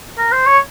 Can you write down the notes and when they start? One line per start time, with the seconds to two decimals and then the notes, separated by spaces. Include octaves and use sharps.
0.18 A#4
0.32 C5
0.46 C#5